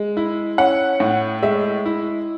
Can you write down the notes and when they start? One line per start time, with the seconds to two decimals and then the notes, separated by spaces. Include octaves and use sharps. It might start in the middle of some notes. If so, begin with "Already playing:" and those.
Already playing: G#3
0.17 E4
0.58 C#4 F#5
1.00 A2
1.43 G#3 E5
1.86 E4